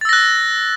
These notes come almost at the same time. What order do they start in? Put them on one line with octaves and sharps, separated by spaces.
A6 E6 A#6 F#6